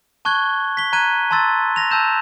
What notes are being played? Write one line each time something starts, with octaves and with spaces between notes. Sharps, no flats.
A5 C#6 F#6 G#6 G7
B6 G7
A#5 F#6 G#6 D#7 G7
A5 A#5 C6 E6 A6
A#6 F7
A5 E6 G6 E7